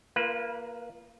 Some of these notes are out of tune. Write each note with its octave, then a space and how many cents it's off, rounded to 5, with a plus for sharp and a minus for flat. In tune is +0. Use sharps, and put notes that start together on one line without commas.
A#3 +0 F4 -35 B4 -25